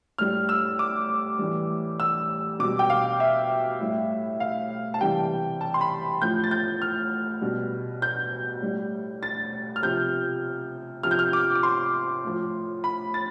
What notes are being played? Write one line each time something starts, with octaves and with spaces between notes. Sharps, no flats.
A2 G3 F6
E6
D6
A2 E3 G3
E6
B2 G3 D6
G5
F5
E5
A2 G3
F5
A5
C3 E3 G3 G5
A5
C6
B5
A2 F3 G6
A6
G6
F6
B2 G3
G6
A2 G3
A6
F6
C3 F3 G6
C3 F3 F6
G6
F6
D6
D6
C6
A2 F3
B5
A6